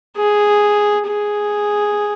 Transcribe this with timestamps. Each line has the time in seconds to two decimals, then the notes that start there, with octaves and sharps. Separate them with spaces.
0.17 G#4
1.06 G#4